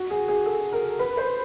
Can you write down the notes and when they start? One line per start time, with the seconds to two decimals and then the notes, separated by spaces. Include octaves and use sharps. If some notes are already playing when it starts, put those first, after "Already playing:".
Already playing: F#4
0.10 G#4
0.28 G#4
0.46 A4
0.73 A#4
0.99 B4
1.17 C5